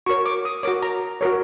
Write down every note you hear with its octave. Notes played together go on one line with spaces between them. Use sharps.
F#4 A#4 C#5 C#6
D6
D#6
F#4 A#4 C#5 D6
A#5
F#4 A#4 C#5